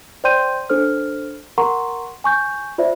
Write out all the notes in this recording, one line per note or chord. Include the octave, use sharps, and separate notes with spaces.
C5 D5 G5 C6 G6 D#7
D4 A4 C5 F6
A#4 F#5 A#5 C6 C#6
G#5 C#6 G6
F4 C5 D5 E5